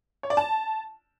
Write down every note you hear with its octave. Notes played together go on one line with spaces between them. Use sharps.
C#5
D5
A5